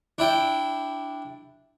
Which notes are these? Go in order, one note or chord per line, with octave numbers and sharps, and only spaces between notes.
D4 E4 G5